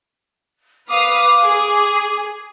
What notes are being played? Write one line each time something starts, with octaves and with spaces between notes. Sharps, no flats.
B4 F5 D6 D#6
G#4